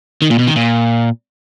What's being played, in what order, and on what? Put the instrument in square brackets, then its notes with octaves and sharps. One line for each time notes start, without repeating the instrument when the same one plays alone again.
[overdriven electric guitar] D#3
A#2
B2
D#3
A#2